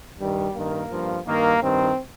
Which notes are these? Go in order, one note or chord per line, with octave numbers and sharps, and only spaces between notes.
G2 D#3 G3
G2 D#3 A#3
G2 F3
G2 D#3 A#3
G2 D#3 C4